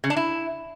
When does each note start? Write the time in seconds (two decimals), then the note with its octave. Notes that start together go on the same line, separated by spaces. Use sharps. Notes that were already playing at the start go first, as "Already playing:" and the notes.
0.04 C#3
0.10 D4
0.17 E4